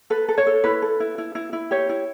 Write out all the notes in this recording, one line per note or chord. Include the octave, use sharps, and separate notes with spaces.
A4 B4
A4
C#5
A4
E4 B4
A4
E4
E4
E4
E4
G4 C#5
E4